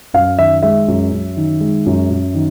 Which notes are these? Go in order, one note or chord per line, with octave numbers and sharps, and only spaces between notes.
F#2 F5
D#3 E5
G#3 E5
F#2
F#2
D#3
G#3
F#2
F#2
D#3